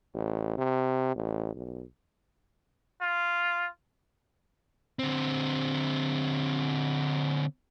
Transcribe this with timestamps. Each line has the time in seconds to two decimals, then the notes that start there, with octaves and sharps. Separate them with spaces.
0.14 A1
0.58 C3
1.16 A1
1.56 B1
3.01 F4
4.99 D3 C4